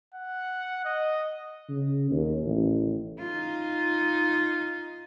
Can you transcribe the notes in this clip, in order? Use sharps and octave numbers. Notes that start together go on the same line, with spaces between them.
F#5
D#5
C#3
D#2
A1
D#4 F4